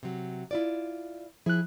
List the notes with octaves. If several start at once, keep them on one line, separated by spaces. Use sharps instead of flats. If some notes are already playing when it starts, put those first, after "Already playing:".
C3 F#3
E4 F4 D5
F3 E4 G#4 F#6